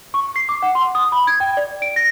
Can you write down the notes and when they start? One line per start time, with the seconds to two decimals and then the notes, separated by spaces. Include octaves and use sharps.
0.14 C#6
0.36 C7
0.49 D6
0.62 F#5
0.75 C6
0.95 D#6
1.12 B5
1.27 G#6
1.40 G5
1.57 D5
1.82 D7
1.96 A#6